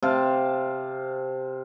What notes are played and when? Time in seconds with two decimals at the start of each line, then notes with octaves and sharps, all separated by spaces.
0.03 C3 F5 A5